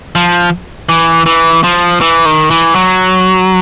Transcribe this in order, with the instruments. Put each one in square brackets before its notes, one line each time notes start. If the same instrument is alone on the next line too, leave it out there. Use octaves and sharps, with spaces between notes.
[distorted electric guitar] F3
E3
E3
F3
E3
D#3
E3
F#3